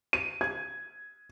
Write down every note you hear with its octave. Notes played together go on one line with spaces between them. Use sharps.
D#7
G#6